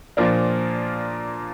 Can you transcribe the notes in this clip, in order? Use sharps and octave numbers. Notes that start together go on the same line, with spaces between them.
A#2 F3 A#3 D4